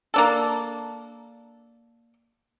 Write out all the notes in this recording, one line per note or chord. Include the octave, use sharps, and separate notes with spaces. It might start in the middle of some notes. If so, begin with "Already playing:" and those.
A#3 D4 A4